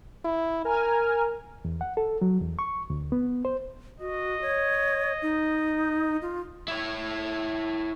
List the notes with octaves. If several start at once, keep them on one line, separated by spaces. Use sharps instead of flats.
E4
A#4 G#5 A#5 F6
E2
F#5
A4
F#3
E2
C#6
D2
B3
C5
F#4 D#5
C#5
D#4
F4
E4 C#5